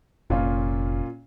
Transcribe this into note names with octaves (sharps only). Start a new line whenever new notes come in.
F1 A#2 C#4 F4